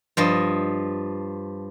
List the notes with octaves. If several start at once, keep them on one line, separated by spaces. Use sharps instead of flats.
G2 F3 D#5